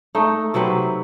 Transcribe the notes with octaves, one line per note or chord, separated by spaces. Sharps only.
A3 D#4
C3 F#3 C4 B4